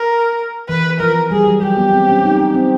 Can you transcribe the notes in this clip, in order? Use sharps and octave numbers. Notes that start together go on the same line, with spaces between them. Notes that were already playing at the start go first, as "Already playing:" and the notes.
Already playing: A#4
E3 B4
F3 A#4
G3 G#4
F#3
G3 G4
B3
C4
C#4
D#4
D4
C4